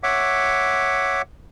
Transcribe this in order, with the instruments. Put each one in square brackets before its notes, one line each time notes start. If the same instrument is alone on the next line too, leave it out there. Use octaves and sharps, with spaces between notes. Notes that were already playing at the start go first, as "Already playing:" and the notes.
[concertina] C#5 E5 F#5 D6